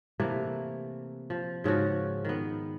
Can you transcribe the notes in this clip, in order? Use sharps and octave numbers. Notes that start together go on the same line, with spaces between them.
C3 E3 A3 A#3
F3
G#2 C#3 F3 F#4
D#3 B3